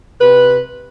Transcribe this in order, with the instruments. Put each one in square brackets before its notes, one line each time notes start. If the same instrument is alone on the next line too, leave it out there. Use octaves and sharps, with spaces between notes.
[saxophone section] C3 B4